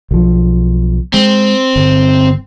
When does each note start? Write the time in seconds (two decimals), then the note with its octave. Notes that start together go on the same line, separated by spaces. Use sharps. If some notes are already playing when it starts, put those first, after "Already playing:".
0.11 B1 F3
1.14 G#3 C4
1.76 G1